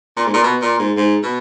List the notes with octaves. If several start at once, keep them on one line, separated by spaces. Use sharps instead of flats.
A#2
G#2
A#2
B2
A#2
G#2
G#2
B2